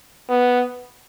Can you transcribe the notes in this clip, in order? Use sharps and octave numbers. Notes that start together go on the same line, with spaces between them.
B3